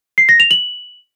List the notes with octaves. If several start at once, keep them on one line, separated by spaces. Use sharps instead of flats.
C7
A#6
F7
F#7